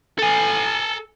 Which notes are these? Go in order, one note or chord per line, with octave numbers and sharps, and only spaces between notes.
A4 G#5